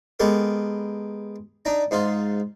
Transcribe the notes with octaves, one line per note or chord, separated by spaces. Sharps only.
G#3 B3 G4 A4 A#4
D4 D#4 A#5
G#2 D#4 F4 C6